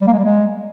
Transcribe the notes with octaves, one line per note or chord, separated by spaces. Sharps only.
G3
A#3
G#3
G3
G#3